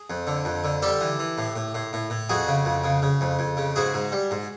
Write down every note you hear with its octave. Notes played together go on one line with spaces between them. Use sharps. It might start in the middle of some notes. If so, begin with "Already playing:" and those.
Already playing: G#4
F2
D3
F2
D3
G3 G4 A4
E3
E3
A2
A2
A2
A2
A2
F2 F#4 G#4
C#3
F2
C#3
C#3
F2
F2
C#3
G#2 F#4 G#4
G#2
G3
G#2